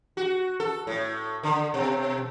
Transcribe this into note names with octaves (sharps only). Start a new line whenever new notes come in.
F#4
A4
A2
D3
B2